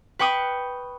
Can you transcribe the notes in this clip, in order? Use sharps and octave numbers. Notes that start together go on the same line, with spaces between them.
B4 G5 C#6 D#6